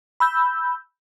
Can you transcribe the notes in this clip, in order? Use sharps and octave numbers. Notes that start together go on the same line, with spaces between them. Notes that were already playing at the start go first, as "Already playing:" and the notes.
B5 E6 G6